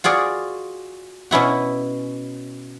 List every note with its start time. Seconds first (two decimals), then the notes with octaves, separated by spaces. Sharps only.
0.04 F4 F#4 G#4 D5
1.31 B2 C#4 E4 F#4